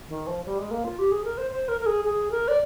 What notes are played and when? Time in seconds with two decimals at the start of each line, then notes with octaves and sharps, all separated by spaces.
0.09 D#3
0.27 F3
0.45 G3
0.58 G#3
0.71 A#3
0.84 F4
0.99 G4
1.11 G#4
1.25 A#4
1.38 C5
1.51 C5
1.68 A#4
1.81 A#4
1.86 G#4
2.05 G#4
2.31 A#4
2.48 D5